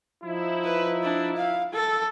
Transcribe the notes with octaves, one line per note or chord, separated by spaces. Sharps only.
F3 D#4 E4
B4
D4
F5
A4